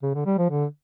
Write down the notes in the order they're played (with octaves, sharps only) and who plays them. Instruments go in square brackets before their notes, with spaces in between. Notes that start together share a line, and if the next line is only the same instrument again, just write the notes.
[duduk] C#3
D3
G3
F3
D3